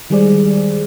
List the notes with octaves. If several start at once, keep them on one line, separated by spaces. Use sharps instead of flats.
D#3 G3 G#3 G#4 C5 D5